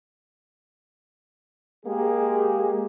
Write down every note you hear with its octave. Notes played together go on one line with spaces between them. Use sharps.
G#3 A#3 G4 G#4